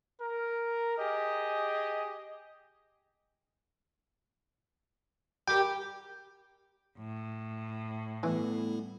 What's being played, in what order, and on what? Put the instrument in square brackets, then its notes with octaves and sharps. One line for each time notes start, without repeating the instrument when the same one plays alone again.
[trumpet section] A#4
G4 G#4 D#5
[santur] G3 A#4 [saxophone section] G4 [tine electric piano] G5
[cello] A2
[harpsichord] E3 [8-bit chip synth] G3 B3 E4 [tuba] A3